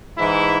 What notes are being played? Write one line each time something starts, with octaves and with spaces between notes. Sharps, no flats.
G#2 E3 E4